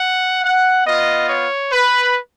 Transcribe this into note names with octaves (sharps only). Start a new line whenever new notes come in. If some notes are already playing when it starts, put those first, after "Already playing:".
Already playing: F#5
F#5
B3 F4 D#5
C#5
B4